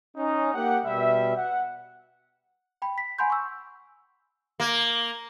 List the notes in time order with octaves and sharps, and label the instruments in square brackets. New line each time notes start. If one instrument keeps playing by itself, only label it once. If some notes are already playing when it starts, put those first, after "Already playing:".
[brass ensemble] C#4 D#4
A#3 G4 F#5
B2 G3 E5
F#5
[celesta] G5 B5
B6
F#5 G#5 B5 C6 G6
C#6 E6
[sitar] A#3